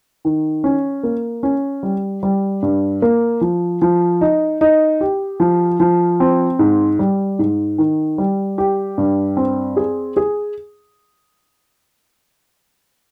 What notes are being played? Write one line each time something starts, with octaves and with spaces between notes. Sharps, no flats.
D#3
C#4
A#3
C#4
G3
G3
G2
A#3
F3
F3
D#4
D#4
G4
F3
F3
C4
G#2
G3
G#2
D#3
G3
G4
G2
C4
G#4
G#4